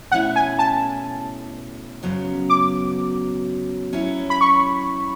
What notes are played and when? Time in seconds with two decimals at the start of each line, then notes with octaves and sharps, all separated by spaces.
0.11 B2 A3 C#4 E4 F#5
0.36 G#5
0.59 A5
2.03 F#2 C#3 F#3 B3
2.50 D6
3.93 F#3 C#4 E4
4.30 B5
4.41 C#6